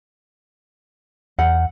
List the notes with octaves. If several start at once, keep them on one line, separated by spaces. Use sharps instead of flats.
E2 F#5